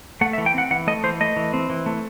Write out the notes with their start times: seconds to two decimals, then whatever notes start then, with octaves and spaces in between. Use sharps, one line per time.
0.21 A3 F#5
0.33 E5
0.38 E3
0.46 G5
0.54 C4 F#5
0.71 E3 F#5
0.87 A3 D#5
1.04 E3 C5
1.20 A3 D#5
1.36 E3
1.53 C4
1.70 E3
1.86 A3